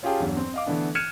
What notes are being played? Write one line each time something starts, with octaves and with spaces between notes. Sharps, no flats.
C#4 F4 G4 G#4 G5 A5
E2 G2 F#3
C4
D#5 F5 D6
D3 E3 A3 B3 D4
F6 F#6 G#6 C#7 D#7 E7